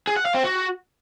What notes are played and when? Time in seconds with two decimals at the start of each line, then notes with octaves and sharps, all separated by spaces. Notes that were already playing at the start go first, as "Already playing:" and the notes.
0.07 G#4
0.16 F#5
0.25 F5
0.34 C4
0.43 F#4